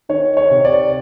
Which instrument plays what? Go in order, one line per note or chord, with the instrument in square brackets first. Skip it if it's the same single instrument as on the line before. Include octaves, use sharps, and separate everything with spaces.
[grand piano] D#3 C#5
C#5
C3
D5